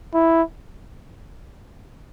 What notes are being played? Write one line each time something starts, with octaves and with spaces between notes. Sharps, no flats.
E4